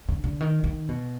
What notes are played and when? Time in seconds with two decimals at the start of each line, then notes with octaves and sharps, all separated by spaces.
0.09 D3
0.24 D3
0.41 D#3
0.64 D#3
0.89 B2